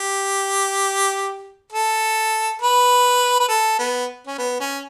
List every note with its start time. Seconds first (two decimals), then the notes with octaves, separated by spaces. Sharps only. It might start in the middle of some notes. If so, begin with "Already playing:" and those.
Already playing: G4
1.73 A4
2.62 B4
3.40 B4
3.49 A4
3.79 B3
4.27 C#4
4.38 B3
4.60 C#4